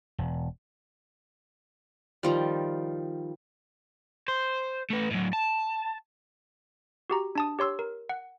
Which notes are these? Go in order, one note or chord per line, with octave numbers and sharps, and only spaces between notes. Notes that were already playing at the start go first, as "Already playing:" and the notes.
E1
D#3 F3 G3
C5
A3 B4
A2 F#3
A5
F#4 G4 A#5
D4 A5 D#6
G4 C#5 C6 E6
A#4
F#5